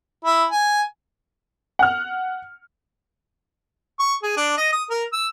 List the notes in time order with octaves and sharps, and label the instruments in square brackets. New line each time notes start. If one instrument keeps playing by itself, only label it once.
[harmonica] E4
G#5
[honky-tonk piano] F#5 F6
[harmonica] C#6
G#4
D4
D#5
D#6
A#4
E6